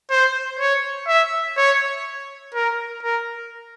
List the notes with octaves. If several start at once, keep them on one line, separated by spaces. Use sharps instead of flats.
C5
C#5
E5
C#5
A#4
A#4